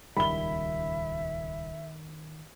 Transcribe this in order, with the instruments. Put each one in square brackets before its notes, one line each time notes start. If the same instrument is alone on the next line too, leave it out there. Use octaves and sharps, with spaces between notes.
[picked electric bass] D#1 C#2 G3 [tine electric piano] D#3 [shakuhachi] E5 [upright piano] B5 G7